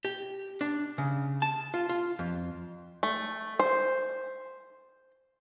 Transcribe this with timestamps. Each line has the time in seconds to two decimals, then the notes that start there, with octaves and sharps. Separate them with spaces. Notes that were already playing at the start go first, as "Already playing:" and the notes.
0.05 G4
0.61 D4
0.98 C#3
1.42 A5
1.74 F4
1.89 F4
2.19 F2
3.03 A3
3.60 C5